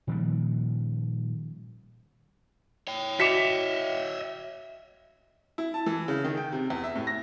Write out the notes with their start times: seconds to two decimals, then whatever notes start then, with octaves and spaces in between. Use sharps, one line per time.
0.07 A#2 D#3 F3 G3
2.87 C#5 G5
3.20 F#4 D#5 E5 D6 B6 C#7 E7 F7
5.58 E4
5.74 A5
5.86 E3
6.08 C#3
6.24 D#3
6.37 G5
6.52 C3
6.70 E2
6.84 E5
6.95 A2
7.07 A#6